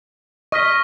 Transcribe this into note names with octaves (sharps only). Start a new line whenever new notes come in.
D#5 C#6 F6 B6